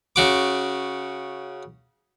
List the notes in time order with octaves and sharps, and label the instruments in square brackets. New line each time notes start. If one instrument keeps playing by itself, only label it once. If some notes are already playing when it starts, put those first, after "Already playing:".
[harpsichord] C#3 F#4 D6